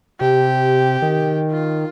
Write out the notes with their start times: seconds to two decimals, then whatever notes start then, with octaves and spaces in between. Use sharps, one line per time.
0.21 C3 G4
1.02 D#3
1.52 F4